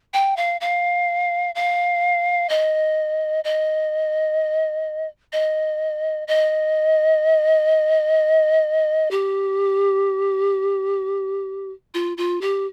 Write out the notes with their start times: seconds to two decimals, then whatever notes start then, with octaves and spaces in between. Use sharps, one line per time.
0.13 G5
0.36 F5
0.61 F5
1.55 F5
2.49 D#5
3.44 D#5
5.32 D#5
6.28 D#5
9.11 G4
11.94 F4
12.17 F4
12.41 G4